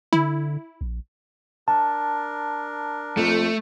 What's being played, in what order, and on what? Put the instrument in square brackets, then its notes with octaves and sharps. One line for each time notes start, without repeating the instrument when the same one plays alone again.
[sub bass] D3 [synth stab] E4
[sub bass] A#1
[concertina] D4 A#4 [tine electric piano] A5
[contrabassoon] F2 [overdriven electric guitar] A3